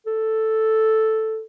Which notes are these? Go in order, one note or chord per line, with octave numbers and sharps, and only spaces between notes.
A4